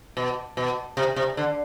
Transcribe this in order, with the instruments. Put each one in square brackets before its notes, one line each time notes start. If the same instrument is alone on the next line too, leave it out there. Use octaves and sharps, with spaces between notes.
[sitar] B2
B2
C3
C3
D3